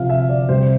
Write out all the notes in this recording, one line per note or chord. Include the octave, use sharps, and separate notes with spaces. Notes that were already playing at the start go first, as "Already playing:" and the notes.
Already playing: C3 F3 F5
E5
D5
C3 G3 C5